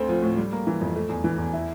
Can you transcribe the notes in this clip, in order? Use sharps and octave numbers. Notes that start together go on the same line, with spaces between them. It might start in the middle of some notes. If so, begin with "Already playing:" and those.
Already playing: D2 A3 C4
F3
A2
G3
A#3
E3
F2
A3
E2
E3
E2
E4